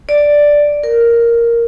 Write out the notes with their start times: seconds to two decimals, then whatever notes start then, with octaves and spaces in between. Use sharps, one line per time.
0.09 D5
0.83 A#4